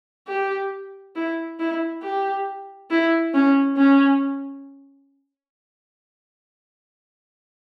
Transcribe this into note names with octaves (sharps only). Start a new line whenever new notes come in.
G4
E4
E4
G4
E4
C#4
C#4